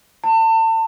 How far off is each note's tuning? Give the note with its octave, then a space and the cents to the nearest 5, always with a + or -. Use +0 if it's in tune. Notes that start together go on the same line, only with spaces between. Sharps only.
A5 +35